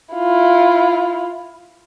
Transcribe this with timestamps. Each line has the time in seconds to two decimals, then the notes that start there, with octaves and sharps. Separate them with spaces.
0.15 E4 F4